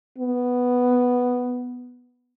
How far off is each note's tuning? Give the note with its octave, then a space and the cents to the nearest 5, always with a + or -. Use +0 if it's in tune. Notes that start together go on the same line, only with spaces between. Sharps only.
B3 +0